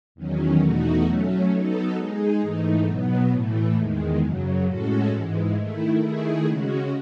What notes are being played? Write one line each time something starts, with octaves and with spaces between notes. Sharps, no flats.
E2 D#3 F#3 C#4
E2 B2 A3 D#4 F#4
F#3 A3 C#4
F#3 B3 D#4 A4
G#3 D#4 G#4
G#2 E3 A3 D#4
B2 F#3 B3
A2 E3 A3
E2 D#3 G#3
F#2 C#3 F#3
A2 G#3 C#4 F#4 A4
G#2 E3 G#3
D#3 A3 E4
D#3 A3 E4 G#4
C#3 G#3 C#4 F#4